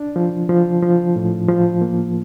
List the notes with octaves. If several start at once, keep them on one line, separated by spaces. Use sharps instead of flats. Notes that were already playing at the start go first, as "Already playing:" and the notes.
Already playing: D4
F3
F3
F3
A2
F3
A#3